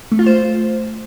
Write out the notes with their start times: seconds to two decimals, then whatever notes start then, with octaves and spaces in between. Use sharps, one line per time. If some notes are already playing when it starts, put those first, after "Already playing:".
0.12 A3
0.19 F4
0.26 C5